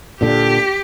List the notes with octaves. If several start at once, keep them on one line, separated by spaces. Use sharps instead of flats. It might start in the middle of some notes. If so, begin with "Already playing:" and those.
A#2 D3 G4